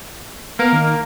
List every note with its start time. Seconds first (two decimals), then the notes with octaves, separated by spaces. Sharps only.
0.59 A#3 B3 A#4
0.73 D#3